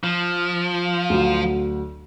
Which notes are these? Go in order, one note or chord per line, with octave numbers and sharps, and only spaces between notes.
F3
D2 F#3